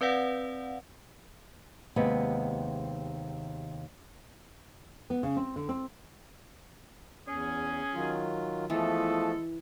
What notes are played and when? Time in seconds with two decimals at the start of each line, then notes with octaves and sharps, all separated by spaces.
0.01 C4 B4 D5 F5 F#5
1.96 D#2 C3 G#3 B3
5.10 B3
5.23 C#3
5.37 C4
5.56 D3
5.69 C4
7.27 E2 C#4 G#4
7.94 D#3 F#3 F4
8.70 E3 F3 G#3 A3 B3 A4